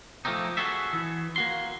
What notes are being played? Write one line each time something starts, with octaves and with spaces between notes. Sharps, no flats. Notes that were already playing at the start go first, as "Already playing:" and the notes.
F3 A3 A#3 C4 D#4
F#4 G#4 A4 E5
E3
A#3 F#4 C6